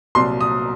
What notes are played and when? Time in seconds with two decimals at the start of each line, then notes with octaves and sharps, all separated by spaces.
0.15 C2 A#2 F#3 C6
0.41 D#6